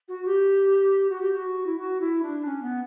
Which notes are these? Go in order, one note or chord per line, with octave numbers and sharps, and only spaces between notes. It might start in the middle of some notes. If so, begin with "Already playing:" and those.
F#4
G4
F#4
G4
F#4
E4
F#4
E4
D4
C#4
B3